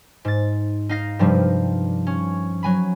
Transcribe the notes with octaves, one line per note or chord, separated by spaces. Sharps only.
G#2 A6
D#4 F5 A#6
G2 C3 F3 G3
C#4
F#3 G#5 B5